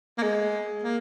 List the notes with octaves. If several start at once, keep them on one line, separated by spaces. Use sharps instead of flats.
A#3
G#3
A#3